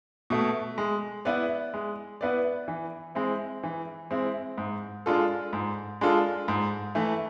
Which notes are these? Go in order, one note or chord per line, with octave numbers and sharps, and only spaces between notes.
B2 A3
G#3
B3 E4 B4 D5
G#3
B3 E4 B4 D5
E3
G#3 C4 E4
E3
G#3 C4 E4
G#2
G#3 D4 F4 A4
G#2
G#3 D4 F4 A4
G#2
E3 A3